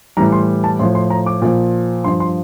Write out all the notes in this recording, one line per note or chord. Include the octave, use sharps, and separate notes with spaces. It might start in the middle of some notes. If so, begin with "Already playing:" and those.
A2 E3 G3 A#5
C6
A5
A2 F3 C6
C6
A#5
D6
A#2 F3
G2 F3 C6
C6